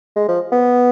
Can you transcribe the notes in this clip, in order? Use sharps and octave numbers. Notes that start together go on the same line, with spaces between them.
G#3
F3
B3